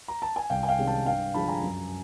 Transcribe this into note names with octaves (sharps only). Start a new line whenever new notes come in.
A#5
A5
G#5
C2 F5 G5
G#5
F5 G5
C3 D#3 G#3 C#4
G5 A5
G2 F5 G5
D3 F3 G#3 A5 B5
G#5 A#5
F#2